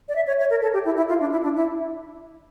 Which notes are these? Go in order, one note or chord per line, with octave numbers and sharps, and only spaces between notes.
D5
E5
C#5
C#5
A#4
A4
G4
E4
E4
F4
D4
E4
D4
E4